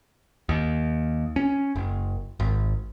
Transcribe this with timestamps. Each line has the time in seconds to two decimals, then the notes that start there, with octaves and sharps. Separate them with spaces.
0.49 D#2
1.36 C#4
1.75 F#1
2.40 G#1